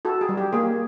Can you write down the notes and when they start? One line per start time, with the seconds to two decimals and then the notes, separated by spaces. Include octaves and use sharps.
0.05 F#4 A4
0.21 G#4
0.29 G3
0.37 G4
0.53 A#3 G#4